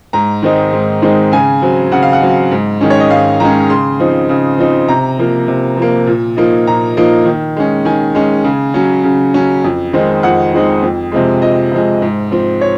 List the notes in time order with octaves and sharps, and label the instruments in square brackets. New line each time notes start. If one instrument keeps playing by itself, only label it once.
[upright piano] G#2 A#5
D#3 G#3 C4 D#4
G#2
D#3 G#3 C4 D#4
C#3 G#5
F#3 C4
C#3 F#5
F5
F#5
F#3 C4
G#2
D#3 G#3 C#4
C#5
D#5
G#2 F5
D#3 G#3 C#4 A#5
C#3 C6
F3 C4 D#4
C#3
F3 C4 D#4
C3 A#5
F3 A#3
C3
F3 A#3
A#2
F3 A#3 D#4
A#2 A#5
F3 A#3 D#4
D#3
G#3 C#4
D#3 G#5
G#3 C#4
C#3
F#3 C#4
C#3
F#3 C#4
F2
D#3 G#3 C4 D#4
F2 F#5
D#3 G#3 C4 D#4
F2
C3 F3 G#3
F2 D#5
C3 F3 G#3
G#2
F3 C4
C#5